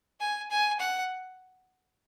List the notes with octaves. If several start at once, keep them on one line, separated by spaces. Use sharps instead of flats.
G#5
G#5
F#5